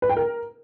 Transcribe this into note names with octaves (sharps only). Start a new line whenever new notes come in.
B4
G5
A#4